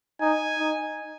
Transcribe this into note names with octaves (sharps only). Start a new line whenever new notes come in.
D#4 G#5
D#4